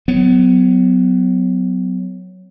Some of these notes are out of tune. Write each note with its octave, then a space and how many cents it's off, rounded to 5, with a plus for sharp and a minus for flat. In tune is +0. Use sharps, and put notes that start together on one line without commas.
F#3 +0 B3 +30